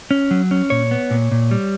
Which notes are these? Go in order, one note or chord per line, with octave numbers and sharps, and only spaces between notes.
C#4
F#3
C#4
A#2 C#5
B3
A#2
A#2
G3